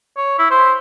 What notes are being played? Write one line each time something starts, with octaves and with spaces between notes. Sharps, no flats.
C#5
E4
C5